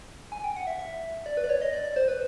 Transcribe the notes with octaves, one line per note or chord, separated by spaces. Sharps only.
G#5
G5
F#5
E5
E5
D5
B4
D5
C#5
D#5
D5
D5
C5
B4